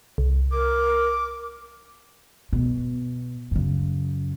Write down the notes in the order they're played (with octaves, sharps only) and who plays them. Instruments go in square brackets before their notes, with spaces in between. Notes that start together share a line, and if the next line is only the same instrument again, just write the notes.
[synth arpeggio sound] C2
[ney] A#4 [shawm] D6
[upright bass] B2
F#2 C#3